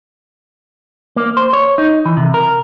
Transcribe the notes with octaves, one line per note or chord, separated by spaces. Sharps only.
A#3
C5
C#5
D#4
E3
C3
A#4